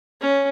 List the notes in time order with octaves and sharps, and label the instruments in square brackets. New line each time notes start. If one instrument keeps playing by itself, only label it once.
[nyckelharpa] C#4